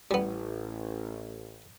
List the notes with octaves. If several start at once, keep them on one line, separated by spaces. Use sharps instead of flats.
A1 G3 B3